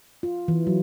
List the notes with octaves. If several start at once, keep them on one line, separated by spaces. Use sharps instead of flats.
F4
E3
F#3